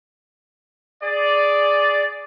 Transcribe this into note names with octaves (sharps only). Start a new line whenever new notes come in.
G#4 D5